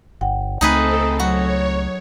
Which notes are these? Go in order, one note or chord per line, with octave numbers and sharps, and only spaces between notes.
G1 F#5 G5
C#2 A3 C4 D#4 G#4 A4 B4
F#3 F#4 C#5